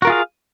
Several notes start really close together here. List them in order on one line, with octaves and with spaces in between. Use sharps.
F#4 A#4 F4 G#4 F5